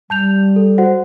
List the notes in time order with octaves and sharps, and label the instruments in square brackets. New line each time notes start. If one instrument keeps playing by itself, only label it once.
[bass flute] G3 [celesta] A5 G6 F7
[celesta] A4
F#4 C5 F#5